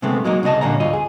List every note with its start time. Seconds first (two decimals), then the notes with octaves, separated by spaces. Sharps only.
0.02 C3 D#3 G#3 A3 B3 C4
0.24 F#3 G#3 A#3 D#4
0.43 C2 C#3 F4 D#5 A5
0.61 A#2 D3 G3 A#3 C#4 A#5
0.80 D2 G#2 F4 D#5
0.93 G#4